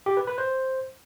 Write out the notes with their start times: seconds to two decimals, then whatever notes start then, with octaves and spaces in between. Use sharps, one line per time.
0.06 G4
0.17 B4
0.27 B4
0.38 C5